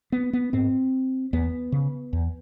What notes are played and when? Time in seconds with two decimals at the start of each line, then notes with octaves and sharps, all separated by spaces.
0.12 B3
0.33 B3
0.53 G#2 C4
1.33 E2 B3
1.72 C#3
2.13 E2